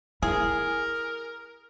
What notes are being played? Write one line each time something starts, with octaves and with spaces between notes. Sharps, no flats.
E4 G#4 A#4